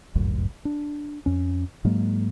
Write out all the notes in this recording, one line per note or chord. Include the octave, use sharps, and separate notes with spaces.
G1 C#2 F#2 A2
D4
F2 C#4
G#2 F#3 G#3 A#3